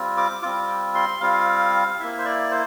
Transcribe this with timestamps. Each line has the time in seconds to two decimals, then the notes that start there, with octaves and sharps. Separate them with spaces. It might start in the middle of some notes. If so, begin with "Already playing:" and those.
Already playing: G3 C4 F4
0.17 D6
0.42 G3 C4 F4 D6
0.95 C6
1.21 G3 C4 F4 F5
1.99 A#3 E4 E5
2.19 C5
2.25 D5
2.51 C5